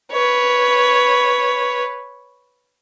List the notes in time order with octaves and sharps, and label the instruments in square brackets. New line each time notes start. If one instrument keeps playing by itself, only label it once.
[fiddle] B4 C#5